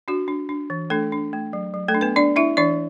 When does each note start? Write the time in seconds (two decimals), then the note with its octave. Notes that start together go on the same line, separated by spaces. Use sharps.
0.08 D4 F#4
0.28 D4
0.49 D4
0.70 E3
0.90 A3 D4 A4
1.12 D4
1.33 A3
1.53 F#3
1.74 F#3
1.88 A3 A4
1.94 D4
2.01 B3 B4
2.16 D4 D5
2.36 D4 E4 E5
2.57 E3 D4 D5